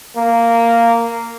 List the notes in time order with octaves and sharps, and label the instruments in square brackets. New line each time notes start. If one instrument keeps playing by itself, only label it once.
[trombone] A#3